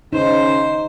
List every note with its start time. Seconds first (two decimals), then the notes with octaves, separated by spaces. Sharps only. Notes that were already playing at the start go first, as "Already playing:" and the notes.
0.13 C#3 D#4 C5